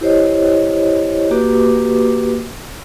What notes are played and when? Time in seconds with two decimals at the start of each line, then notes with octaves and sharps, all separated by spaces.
0.01 E4 G4 C5 C#5 D#5
1.31 A#3 F#4 G4 B4 D6